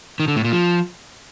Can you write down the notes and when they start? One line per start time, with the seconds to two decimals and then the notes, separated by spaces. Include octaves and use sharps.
0.20 D#3
0.28 D3
0.36 A2
0.44 A#2
0.53 F3